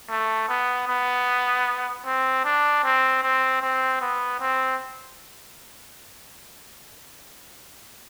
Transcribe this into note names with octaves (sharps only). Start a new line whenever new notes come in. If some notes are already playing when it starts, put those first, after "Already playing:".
A3
B3
B3
C4
D4
C4
C4
C4
B3
C4